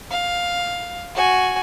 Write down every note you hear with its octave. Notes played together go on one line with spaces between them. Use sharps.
F5
F#4 G#5